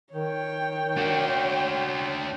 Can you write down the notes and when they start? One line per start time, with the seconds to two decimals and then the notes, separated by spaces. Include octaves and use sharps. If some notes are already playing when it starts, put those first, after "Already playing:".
0.13 D#3 C#5 G5
0.97 D4 F#4